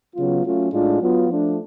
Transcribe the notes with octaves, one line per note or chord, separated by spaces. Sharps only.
C#3 F#3 B3 F4
F#3 A3 C#4 F4
A2 G#3 D4 F4
F#3 B3 F4
F3 A3 D4